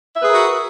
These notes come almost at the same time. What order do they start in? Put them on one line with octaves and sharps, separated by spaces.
E5 B4 G#4 A#4 F#4